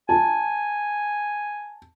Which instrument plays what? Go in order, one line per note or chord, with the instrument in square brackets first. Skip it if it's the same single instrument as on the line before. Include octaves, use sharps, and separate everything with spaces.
[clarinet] G#5 [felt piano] A5